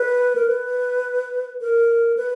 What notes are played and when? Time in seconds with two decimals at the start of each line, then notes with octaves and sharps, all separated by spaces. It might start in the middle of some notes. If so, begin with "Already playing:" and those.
Already playing: B4
0.35 A#4
0.48 B4
1.61 A#4
2.17 B4